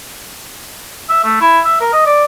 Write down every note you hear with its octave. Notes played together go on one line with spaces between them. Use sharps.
E5
A3
E4
E5
A#4
D#5
D5